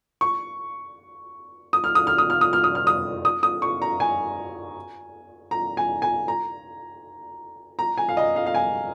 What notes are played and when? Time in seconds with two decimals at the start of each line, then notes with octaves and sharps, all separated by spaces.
0.21 C#6
1.73 D#6
1.84 F6
1.95 D#6
2.07 F6
2.18 D#6
2.30 F6
2.41 D#6
2.53 F6
2.64 D#6
2.75 F6
2.87 D#6
3.25 D#6
3.43 D#6
3.62 C#6
3.82 A#5
4.00 G#5
5.51 A#5
5.77 G#5
6.02 G#5
6.28 A#5
7.79 A#5
7.98 G#5
8.09 F5
8.17 D#5
8.36 F5
8.46 F5
8.55 G#5